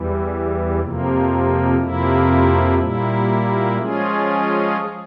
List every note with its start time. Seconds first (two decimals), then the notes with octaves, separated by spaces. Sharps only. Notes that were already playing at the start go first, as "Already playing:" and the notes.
Already playing: E2 E3 G3
0.80 F2 C3 F3 A#3
1.79 F2 C3 F3 A#3 E4
2.78 A#2 G3 A#3 E4
3.78 F3 G#3 C#4 F4 G#4